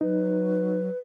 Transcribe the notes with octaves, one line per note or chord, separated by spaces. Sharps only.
F#3 D#4 B4